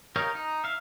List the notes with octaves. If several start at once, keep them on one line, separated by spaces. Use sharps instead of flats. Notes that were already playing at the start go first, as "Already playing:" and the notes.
D#4 G4 A#4 C#5 F5
D#4
E5 F5